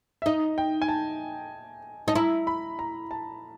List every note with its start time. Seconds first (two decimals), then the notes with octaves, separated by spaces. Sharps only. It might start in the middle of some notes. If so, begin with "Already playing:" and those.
0.22 E5
0.26 D#4 D#5
0.58 G5
0.82 G#5
0.88 A5
2.08 D#4 A5
2.15 E4 A#5
2.47 B5
2.79 A#5
3.11 A5